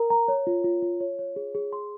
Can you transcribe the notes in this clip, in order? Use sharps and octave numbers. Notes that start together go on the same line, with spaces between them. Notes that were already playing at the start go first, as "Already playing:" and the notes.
Already playing: A#4 A#5
A#5
C#5
F4
F4
F4
C#5
C#5
G#4
G#4
C6